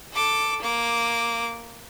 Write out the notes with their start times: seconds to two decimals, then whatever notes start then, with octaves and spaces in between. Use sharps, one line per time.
0.14 A4 D6
0.62 A#3 D6